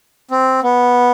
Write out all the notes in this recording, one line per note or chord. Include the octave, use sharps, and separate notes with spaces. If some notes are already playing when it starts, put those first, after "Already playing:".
C4
B3